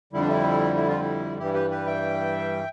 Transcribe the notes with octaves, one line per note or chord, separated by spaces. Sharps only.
F2 D3 G3 E4
D4
E4
E4
F4
E4
G2 E3 G3 E4 G4
G4 B4
G4 B4
E5 G5